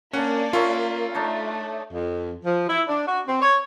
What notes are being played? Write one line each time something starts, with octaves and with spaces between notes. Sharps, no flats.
A#3 C#4 D4 D5 F#5
C#4 F4 E5
A3 D4 D#4 C#5
F2
F3
E4
D4
F#4
C4
C#5